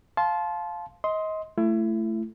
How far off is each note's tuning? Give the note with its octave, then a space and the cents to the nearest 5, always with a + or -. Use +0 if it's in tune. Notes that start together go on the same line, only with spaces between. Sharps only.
F5 +0 A5 -25 C6 +0
D#5 +25 C6 +0
A3 +0 E4 +30